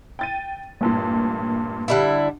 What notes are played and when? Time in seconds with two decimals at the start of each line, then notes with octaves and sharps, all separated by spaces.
0.19 G5 A6 D#7
0.81 A1 G2 A#2
1.88 D3 G3 E4